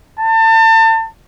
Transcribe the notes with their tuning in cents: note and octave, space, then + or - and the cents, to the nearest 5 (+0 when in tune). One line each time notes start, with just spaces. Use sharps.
A5 +35